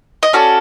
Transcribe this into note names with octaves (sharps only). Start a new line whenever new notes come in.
D#5
C#4 F#4 A4 D5